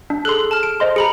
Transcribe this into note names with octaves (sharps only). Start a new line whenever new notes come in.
D4
G#4 A4 C6 F#6
A5 F6
D7
C5 D#5 C6
G#4 A#5 B5 C#7